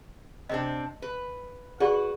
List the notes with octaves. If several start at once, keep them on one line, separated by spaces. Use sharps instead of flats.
C3 C4 D4 D#5
B4
F#4 G#4 B4 D5 F#5